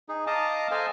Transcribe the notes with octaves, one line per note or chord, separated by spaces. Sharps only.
D#4 G#4
D#5 F5 A5 A#5 D6 D#6
A4 C5 D#5 F5 G#5 A5